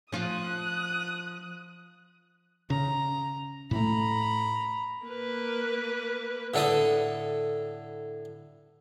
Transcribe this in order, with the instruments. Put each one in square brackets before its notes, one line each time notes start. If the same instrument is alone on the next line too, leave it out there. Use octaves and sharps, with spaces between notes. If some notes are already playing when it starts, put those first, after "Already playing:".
[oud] F3 F4 [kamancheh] D#6 F#6
[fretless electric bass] C#3 [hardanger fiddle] A#5
[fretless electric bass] A2 A3 [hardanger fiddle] A#5 B5
[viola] A#3 B4
[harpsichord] A2 D3 A4 B4 D#6